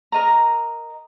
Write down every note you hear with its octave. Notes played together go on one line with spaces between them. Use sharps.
A#4 D#5 A#5